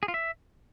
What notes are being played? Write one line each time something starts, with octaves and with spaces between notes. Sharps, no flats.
G#4
F4
E5